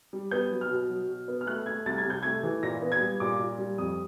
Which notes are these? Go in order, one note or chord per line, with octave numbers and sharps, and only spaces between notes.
G3
B3 G6
F#3
F6
B2
F#3
B2
B3
F6
A3 F#6
A3 G#6
C2 A6
G#6
C3 G6
A3 G#6
E3
A#2 A#6
B3
G#6
G3
A#2 D6
A#2
G3
F2 D#6